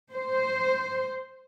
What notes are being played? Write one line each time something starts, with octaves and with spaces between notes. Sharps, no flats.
C5